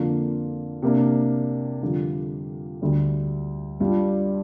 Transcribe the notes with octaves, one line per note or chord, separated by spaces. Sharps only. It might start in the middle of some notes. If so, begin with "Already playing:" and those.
Already playing: F2 D3 A#3 D4 F4
C3 A#3 D4
F2 D3 G3 D4 F4
D2 D3 G3 D4
G2 G3 D4 F4